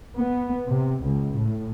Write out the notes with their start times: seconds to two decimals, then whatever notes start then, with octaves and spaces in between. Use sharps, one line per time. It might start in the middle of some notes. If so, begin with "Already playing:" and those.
0.17 B3
0.68 C3
1.04 C#2
1.35 A2